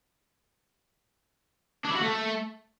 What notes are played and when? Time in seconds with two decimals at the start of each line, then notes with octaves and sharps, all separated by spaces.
1.84 D4
1.90 E4
1.96 F#4
2.01 A3